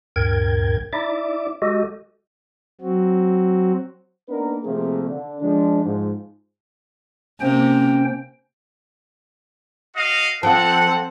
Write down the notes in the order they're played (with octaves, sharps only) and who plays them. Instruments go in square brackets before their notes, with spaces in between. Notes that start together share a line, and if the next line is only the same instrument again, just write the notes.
[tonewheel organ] D2 G2 A#2 A#4 G5 G#6
D#4 E4 D5 E5 D6
G#3 F#4 G4 A4 D#5
[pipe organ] F#3 C4 F#4
[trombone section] A#3 B3 D4 D#4 A#4 B4
C3 F3 A3 A#3 C4 G#4
D3
F3 G#3 D4
G#2 F3
[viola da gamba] C3 A#3 [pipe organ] C#4 C5 G5
[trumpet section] F#4 D#5 F5
[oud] F3 [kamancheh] C4 A4 [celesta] F5 A5 [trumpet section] F#5